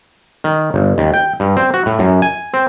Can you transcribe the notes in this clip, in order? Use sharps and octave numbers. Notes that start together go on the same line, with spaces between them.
D#3
G1
D#2
G5
G2
C4
F#4
A2
F#2
G#5
C4